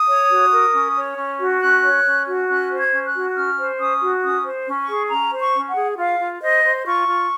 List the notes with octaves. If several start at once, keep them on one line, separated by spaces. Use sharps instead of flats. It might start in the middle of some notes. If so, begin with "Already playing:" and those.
Already playing: D#6
C#5
F#4
A#4
C#4
C#5
C#4
F#4
C#4 F#6
C#5
C#4
F#4
C#4 F#6
C5
G#6
C#4
F#6
F#4
C#4 F6
C5
C#4 D#6
F#4
C#4 D#6
C5
C#4
C#6
G#4
C#4 A#5
C5
C#6
C#4
F#5
G#4
F4 F5
F4
C5 D#5
C5
F4 C#6
F4